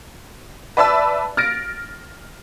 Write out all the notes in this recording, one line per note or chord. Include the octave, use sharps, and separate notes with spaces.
B4 D5 E5 A5 B5 E6
F6 A6 A#6 D7